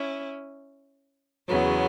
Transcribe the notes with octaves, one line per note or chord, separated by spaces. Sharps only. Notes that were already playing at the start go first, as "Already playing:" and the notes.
Already playing: C#4 E4
E2 C#3 F#3 B3